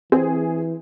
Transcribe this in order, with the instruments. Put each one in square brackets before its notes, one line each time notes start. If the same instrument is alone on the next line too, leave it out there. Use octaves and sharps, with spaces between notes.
[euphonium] E3 [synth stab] C4 [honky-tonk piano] G#4